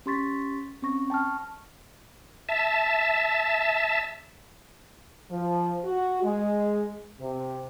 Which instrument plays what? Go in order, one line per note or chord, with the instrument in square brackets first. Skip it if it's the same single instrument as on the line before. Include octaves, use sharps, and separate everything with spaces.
[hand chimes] C#4 G4 C6 C#6 A6 B6
C4 C#4 C#6 A#6
G5 A5 C#6 F6
[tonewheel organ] E5 A5
[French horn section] F3
F#4
G#3
C3